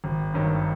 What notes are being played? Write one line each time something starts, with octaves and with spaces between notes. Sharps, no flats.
G#1
G2 D#3 F#3